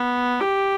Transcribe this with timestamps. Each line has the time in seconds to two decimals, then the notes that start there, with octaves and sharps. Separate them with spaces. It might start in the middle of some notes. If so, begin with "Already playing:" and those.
Already playing: B3
0.40 G4